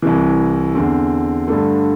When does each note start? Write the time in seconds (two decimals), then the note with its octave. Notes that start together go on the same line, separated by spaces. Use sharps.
0.02 C2 C3 E3
0.75 E2 D3 C4
1.48 G2 D3 A3